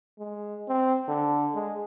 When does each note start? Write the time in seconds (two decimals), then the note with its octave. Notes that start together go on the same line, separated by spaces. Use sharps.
0.19 G#3
0.69 C4
1.08 D3
1.55 G#3